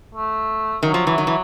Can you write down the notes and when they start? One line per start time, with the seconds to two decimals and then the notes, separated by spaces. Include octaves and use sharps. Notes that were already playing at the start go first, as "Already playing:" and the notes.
0.15 A3
0.83 D#3 F#3
0.94 F3
1.07 E3
1.18 D#3
1.27 E3